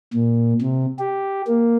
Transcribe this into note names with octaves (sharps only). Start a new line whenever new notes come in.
A#2
C3
G4
A#3